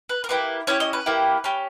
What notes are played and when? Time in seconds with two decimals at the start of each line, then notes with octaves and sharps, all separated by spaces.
0.09 B4
0.24 A#4
0.29 A#3 E4 G4 B4
0.67 C#4 E4 G4 C#5
0.80 D#5
0.93 B4
1.06 A#3 E4 G4
1.44 C#4 G4